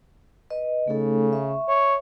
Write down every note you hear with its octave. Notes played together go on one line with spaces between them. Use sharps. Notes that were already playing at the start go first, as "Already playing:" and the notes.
B4 D#5
C#3 A3 D#4 A4
E5 C#6
C#5